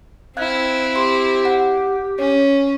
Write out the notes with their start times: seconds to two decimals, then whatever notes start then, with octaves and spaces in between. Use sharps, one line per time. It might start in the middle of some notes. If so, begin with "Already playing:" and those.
0.37 C4 E4 F5 F#6 G#6
0.96 G4 C6
1.45 F#5
2.19 C#4 C#5